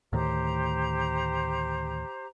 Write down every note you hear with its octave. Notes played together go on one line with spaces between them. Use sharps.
D2 A2 D#3 G4 C5 A#5